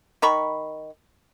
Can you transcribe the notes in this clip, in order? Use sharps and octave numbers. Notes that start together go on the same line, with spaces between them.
D#3 A#5 B5 C#6